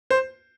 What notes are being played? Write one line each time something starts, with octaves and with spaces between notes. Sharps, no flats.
C5